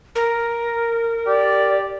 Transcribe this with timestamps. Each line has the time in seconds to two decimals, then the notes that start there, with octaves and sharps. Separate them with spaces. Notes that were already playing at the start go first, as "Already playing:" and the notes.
0.15 A#4
1.26 G4 D5